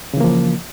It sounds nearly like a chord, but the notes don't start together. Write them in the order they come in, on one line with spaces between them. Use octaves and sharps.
C#3 E3 A#3 F3